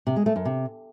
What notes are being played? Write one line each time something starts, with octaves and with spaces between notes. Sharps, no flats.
C3
G#3
A3
F#2
C3